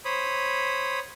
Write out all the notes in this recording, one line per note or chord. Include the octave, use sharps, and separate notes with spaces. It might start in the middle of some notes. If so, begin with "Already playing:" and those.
C5 C#5 B5 D#6